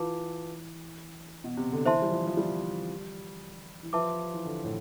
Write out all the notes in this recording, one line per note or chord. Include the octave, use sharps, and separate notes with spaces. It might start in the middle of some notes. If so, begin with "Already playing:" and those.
Already playing: E3 F4 B4 F5 A5 D6
B2
C3
D3
E3 C5 E5 A5 C6
G3
F3
F3
G3
E3
F3 B4 E5 A5 D6
E3
D3
A2